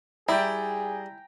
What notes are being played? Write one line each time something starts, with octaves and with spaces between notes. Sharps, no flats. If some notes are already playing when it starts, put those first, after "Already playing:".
G3 E4 G#4 D5 G5 G#5 A#5